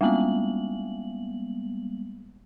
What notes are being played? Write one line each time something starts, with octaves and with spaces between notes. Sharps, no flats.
G3 G#3 A#3 B3 F#7